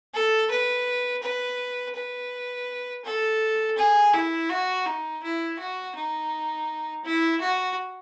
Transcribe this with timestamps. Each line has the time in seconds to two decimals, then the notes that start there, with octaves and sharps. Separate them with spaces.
0.14 A4
0.50 B4
1.22 B4
1.95 B4
3.04 A4
3.77 G#4
4.13 E4
4.50 F#4
4.86 D#4
5.23 E4
5.59 F#4
5.95 D#4
7.04 E4
7.41 F#4